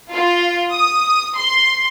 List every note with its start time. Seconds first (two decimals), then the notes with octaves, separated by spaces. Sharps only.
0.13 F4
0.73 D#6
1.37 C6